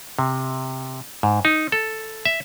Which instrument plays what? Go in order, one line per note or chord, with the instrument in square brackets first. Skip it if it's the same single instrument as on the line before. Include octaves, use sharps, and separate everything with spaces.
[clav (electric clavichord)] C3
G#2
D#4
A4
E5